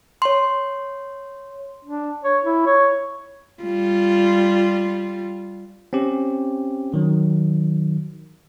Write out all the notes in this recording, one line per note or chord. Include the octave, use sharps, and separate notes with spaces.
C#5 C6
D4
C#5
E4
C#5
G3 F4
C4 C#4 G4
D#3 F#3